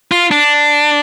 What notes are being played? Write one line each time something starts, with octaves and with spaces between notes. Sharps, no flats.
F4
D4